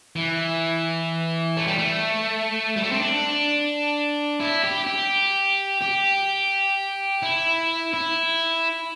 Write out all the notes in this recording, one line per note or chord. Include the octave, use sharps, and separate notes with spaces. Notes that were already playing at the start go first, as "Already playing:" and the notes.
E3
A3
G3
A3
G3
A3
C4
D4
E4
G4
G4
G4
E4
E4